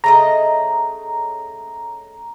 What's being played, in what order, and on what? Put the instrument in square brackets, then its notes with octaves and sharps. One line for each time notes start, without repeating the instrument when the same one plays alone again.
[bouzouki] C#3 A3 D#5 [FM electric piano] A#5